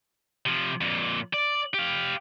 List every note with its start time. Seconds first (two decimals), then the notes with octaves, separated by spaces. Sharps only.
0.46 C3 F3
0.81 F2 A#2
1.34 D5
1.74 G4 F5